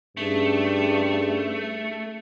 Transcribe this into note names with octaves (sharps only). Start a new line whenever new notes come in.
G2 A3 C#4 D#4 G#4